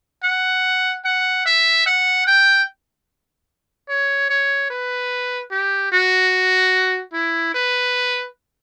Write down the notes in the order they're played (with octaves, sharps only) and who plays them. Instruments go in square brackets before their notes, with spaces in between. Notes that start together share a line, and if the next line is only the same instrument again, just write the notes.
[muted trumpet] F#5
F#5
E5
F#5
G5
C#5
C#5
B4
G4
F#4
E4
B4